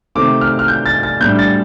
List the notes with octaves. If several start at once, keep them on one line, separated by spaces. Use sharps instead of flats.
C3 D#3 A3 C4 D6
F6
F6
G6
A6
A6
A2 G3 D4 G6
A6